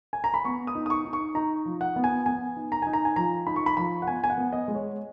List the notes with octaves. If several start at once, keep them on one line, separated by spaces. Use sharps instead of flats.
G#5
A#5
B5
B3 C#6
D#6
D#4
D#6
C#6
D#4
C#6
D#4 A#5
F3
F#5
B3
G#5
B3 G#5
D#4
A#5
D#4 G#5
A#5
G#5
F3 A#5
D#4 B5
C#6
B5
F3 B5
F#5
B3 G#5
G#5
F#5
B3
D#5
G#3
C#5